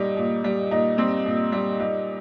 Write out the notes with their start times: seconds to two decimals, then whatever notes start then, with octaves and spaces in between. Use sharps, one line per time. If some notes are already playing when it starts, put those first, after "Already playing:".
Already playing: A#2 G3 D#4
0.17 A#2
0.44 G3
0.71 A#2 D#4
0.98 G3 C4
1.26 A#2
1.52 G3
1.80 G3 D#4